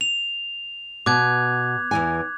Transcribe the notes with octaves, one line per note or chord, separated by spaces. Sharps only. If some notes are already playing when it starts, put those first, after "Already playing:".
F7
B2 D6 F#6 G#6
E2 E3 G#5